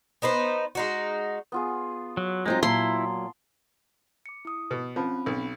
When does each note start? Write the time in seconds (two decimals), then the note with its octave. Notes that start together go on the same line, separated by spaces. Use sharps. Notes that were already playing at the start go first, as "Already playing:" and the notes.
0.22 B3 D#4 B4 C5
0.75 G#3 D#4 F#4
1.52 B3 F4 G#4
2.17 F#3
2.46 F#3 G#3 C4 D#4 F4
2.63 A#2 F#3 E4 A5 C6
4.26 D6 C#7
4.45 E4 D#6
4.71 B2
4.96 F3 C4 C#4 B5
5.26 B1